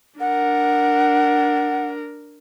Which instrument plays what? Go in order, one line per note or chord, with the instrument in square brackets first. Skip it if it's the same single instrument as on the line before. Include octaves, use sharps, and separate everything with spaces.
[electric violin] D4 A#4 [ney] F#5